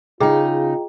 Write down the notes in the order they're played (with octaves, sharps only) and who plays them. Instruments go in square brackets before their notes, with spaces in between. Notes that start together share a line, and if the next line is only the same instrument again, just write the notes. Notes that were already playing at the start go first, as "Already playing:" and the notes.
[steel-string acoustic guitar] C#3 D#4 [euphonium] F4 [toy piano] G#4 [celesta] D#5 G5 A#5